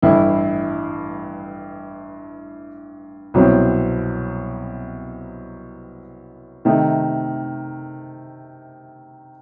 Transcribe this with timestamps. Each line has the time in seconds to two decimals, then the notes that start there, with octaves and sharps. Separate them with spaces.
0.02 A1 G2 E3 A3 E4
3.34 C2 B2 F#3 C4
6.65 C3 D#3 A3 D#4